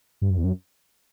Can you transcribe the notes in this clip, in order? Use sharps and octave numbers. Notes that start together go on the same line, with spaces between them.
G2
F#2
E2
F#2